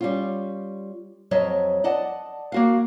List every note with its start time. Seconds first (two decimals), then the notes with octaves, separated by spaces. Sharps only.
0.01 G3 C#4 F4
1.31 F2 F#3 C#5 D#5 E5
1.84 D5 D#5 F#5 A5
2.52 A#3 F#4 F5